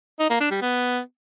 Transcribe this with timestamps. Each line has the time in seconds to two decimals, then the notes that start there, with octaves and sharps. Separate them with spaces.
0.20 D#4
0.30 A#3
0.41 D4
0.51 G3
0.62 B3